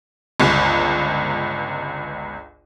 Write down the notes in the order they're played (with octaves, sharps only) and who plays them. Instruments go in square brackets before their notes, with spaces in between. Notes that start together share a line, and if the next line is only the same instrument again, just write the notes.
[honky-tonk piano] G1 C#2